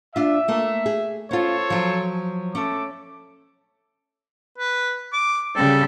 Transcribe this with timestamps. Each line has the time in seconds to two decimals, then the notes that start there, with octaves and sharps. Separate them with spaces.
0.16 D4 F4 E5
0.48 A3 A#3
0.86 G#4
1.31 C#4 F4 A4 C5 C#5
1.70 F3 F#3
2.55 A3 C#4 A4 D6
4.58 B4
5.13 D6
5.56 C#3 G3 A4